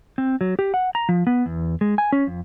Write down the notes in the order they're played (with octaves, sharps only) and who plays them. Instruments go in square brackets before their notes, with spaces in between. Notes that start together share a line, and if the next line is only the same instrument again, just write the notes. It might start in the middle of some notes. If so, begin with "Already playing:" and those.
[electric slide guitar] C4
F#3
G4
F#5
A#5
F3
B3
E2
G#3
G#5
C#4
F2